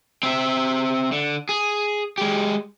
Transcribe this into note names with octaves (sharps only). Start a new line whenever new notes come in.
C4 E5
D3
G#4
G#3 G4